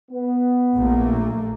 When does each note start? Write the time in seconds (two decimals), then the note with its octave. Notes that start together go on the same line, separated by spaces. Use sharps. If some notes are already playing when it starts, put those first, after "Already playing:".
0.10 B3
0.76 A#1 A3 A#3